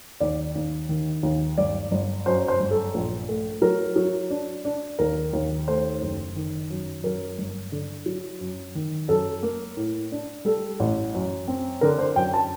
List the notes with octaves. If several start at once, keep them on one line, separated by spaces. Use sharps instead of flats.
D#2 D5
D#2
D#3
D#2
G1 D5
G1
F#2 C5
C5
G1
A4
A#1
A3
F#3 A#4
F#3
D4
D4
D#2 A#4
D#2
A3 C5
F#1
D#3
F#2
F#2 A#4
G1
D3
F#3
F#2
D#3
F#2 A4
A#3
A2
D4
G3 A4
A1
F#2
C4
D3 A#4
C5
F#2 G5
A5